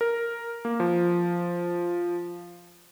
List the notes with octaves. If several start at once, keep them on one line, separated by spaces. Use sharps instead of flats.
A#4
A#3
F3